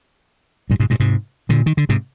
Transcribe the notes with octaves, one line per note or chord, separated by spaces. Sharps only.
G2 A#2
G#2 C3
G2 A#2
G#2 C3
A#2 D3
D#3
D3
G#2 C3